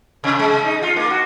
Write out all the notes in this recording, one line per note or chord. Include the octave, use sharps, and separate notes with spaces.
C3
G#3
D#4
F4
A#3
F#4